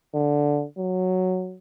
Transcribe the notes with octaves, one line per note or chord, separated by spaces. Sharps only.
D3
F#3